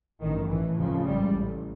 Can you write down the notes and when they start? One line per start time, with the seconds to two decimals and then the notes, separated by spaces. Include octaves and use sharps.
0.21 A1 G2 D#3
0.49 A1 A2 E3
0.77 F1 D#2 C#3 F3
1.05 A1 G#2 G3
1.34 A1 A2